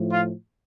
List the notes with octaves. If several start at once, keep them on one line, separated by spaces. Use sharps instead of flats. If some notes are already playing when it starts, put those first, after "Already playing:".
Already playing: A2 F3
F4